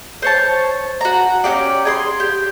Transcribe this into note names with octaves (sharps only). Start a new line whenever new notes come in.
C5 C#5 A5
F#4 A#5
C#4 D#4 G4 D5
G#4 A#5 C6
G4